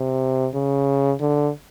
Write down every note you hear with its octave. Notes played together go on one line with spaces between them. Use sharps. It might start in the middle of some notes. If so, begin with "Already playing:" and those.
Already playing: C3
C#3
D3